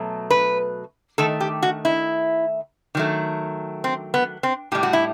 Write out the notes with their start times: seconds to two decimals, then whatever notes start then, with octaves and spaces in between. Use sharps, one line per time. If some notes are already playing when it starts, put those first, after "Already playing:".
Already playing: B2 F#3 A3
0.30 B4
1.18 D#3 A3 A4
1.40 G4
1.63 F#4
1.85 E4
2.95 D#3 F#3 A3
3.84 C4
4.14 B3
4.43 C4
4.72 A2 G3 G4
4.83 F#4
4.93 E4